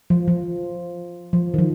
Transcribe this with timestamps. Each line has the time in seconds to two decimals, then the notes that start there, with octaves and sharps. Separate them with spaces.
0.10 F3
0.28 F3
1.33 F3
1.54 D#3
1.58 F3